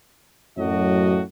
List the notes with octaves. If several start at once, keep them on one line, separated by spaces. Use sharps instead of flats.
F#2 A2 F#3 F#4 D#5